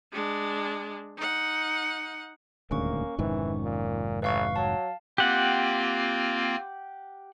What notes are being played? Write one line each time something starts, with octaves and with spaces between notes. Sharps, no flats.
G#3 D4
D#4 F#5
D#1 D2 G#2 A#3 C#4 C#6
F1 G#2 D#3 E3
A#2
A1 B4 F5 C#6
F#3 F5 A5
A#3 C4 F4 G4 F#5